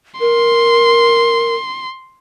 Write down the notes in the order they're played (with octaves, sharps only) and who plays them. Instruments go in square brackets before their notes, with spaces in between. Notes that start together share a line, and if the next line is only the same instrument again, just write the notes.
[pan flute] A#4 [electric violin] C6